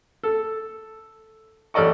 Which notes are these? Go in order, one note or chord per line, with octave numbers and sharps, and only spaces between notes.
A4
A1 A4 D5 D#5 C#6